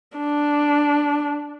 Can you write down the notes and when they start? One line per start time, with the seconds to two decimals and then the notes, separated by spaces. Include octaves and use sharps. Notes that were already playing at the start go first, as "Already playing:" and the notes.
0.17 D4